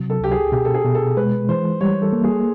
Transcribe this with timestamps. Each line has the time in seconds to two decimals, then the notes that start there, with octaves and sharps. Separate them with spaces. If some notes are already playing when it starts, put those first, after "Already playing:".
Already playing: C3 F#3
0.10 A4
0.20 C#2 G4
0.31 G#4
0.52 B2 G4
0.65 A4
0.74 G#4
0.85 B2
0.95 A4
1.17 G#3 B4
1.49 E3 C5
1.81 G3 C#5
2.02 A4
2.13 A#3
2.24 G#4